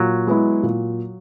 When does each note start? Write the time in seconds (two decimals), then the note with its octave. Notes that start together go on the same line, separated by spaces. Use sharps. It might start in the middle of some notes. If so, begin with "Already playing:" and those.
Already playing: A#2 F#3
0.27 G#3 B3 E4
0.63 A#2